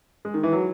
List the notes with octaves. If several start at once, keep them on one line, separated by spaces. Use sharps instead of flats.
G#3
D#3
E3
F#3